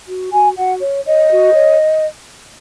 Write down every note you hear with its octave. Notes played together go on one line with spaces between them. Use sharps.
F#4
F#4 G#5
F#4 F#5
C#5
C#5 D#5
F#4
C#5